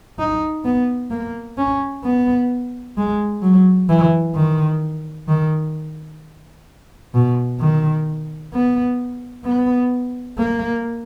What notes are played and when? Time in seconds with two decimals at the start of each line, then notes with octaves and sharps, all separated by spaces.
0.19 D#4
0.64 B3
1.11 A#3
1.58 C#4
2.04 B3
2.97 G#3
3.42 F#3
3.89 E3
4.35 D#3
5.28 D#3
7.14 B2
7.60 D#3
8.53 B3
9.45 B3
10.38 A#3